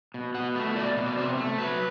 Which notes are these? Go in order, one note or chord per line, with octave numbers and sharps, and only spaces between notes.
B2
B2 F#5
A3
B2 D5
B2
D5
C3 C5
A3
F#3 B4